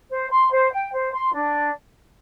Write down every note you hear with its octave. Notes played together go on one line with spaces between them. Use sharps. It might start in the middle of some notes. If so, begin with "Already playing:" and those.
C5
C6
C5
G5
C5
C6
D4